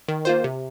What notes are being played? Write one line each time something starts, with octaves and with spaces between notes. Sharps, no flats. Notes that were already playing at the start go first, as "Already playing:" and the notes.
D#3
A#3 F4 C5
C3